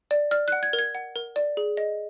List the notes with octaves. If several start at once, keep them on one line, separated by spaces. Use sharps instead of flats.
D5
D5 F6
F#5 F#6
G#6
A#4
G#6
F#5
A#4
D5
G#4
D#5